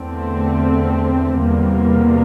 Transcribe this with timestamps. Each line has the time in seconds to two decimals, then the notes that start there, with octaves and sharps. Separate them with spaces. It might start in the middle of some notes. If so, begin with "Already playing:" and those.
Already playing: E2 D3 A3 C4
1.41 E2 C3 G3 A#3